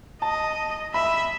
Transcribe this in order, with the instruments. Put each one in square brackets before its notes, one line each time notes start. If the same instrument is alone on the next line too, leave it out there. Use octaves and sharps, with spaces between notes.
[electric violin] D#5 [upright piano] A5
[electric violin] E5 [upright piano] B5